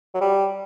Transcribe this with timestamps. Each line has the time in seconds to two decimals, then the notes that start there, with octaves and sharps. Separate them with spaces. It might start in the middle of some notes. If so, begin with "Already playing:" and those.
0.14 F#3
0.21 G3